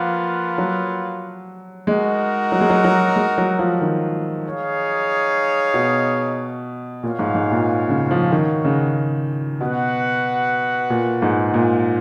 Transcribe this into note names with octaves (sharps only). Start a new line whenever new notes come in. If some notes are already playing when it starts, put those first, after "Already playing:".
Already playing: F3 A#3 F4 B4 F#5
F#3
G#3 D#4 F#4 A#4
F#3
G#3
F#3
F#3
G#3
F#3
F3
D#3
D#4 G#4 C#5 F5
B2
A#2 F#4 C#5 F5
G#2
G#2
A#2
C#3
F3
D#3
C#3
B2 F#4 B4 F#5
A#2
G#2
A#2